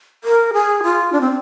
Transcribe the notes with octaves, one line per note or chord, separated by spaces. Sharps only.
A#4
G#4
F4
D4
C4